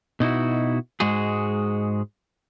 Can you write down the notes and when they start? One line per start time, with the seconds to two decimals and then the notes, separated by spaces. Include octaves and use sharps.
0.20 B2 D#4 E4 F#4
1.00 G#2 G#3 F#4 G#4